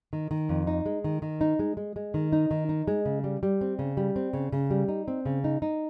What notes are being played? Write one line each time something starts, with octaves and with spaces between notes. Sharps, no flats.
D#3
D#3
F2
D#4
G#3
D#3
D#3
D#4
G#3
G#3
G#3
D#3
D#4
D#3
D#4
G#3
C#3
G3
G3
C4
C#3
G3
C4
C#3
C#3
G3
D#4
C4
C#3
D#4
D#4